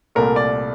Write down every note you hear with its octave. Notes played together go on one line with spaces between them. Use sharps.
C2 A#2 A3 A#4
D5